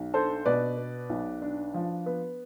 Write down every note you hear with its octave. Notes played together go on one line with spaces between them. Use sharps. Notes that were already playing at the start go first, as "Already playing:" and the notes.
Already playing: B1
D4 A4 C5
B2 B4 D5
B3
B1
D4
F3
B3